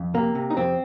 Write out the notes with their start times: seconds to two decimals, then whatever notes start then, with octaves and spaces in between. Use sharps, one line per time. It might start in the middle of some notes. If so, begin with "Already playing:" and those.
Already playing: F2
0.14 C3 A#3
0.35 C3
0.50 D#4
0.57 F2 C4